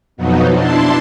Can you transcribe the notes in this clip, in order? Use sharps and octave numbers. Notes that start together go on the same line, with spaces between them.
F2 B2 F3 F#3 B3 D#4
D4 E4 A5 C6